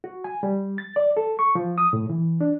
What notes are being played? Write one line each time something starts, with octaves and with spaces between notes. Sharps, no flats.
F#4
G#5
G3
A6
D5
A4
C#6
F3
D#6
A2
E3
D4